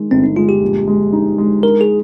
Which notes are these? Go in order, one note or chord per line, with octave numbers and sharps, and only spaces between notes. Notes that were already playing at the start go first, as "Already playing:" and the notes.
Already playing: D#3 G#3
G1 C4
D#4
G#3 F4
G4
A#1
G#3
D#4
G#3
D#4 A#4
G#4